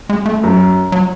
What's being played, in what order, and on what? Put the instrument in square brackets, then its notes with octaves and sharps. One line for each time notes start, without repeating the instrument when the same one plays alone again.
[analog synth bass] G#3
A3
[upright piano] F#2
[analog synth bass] F#3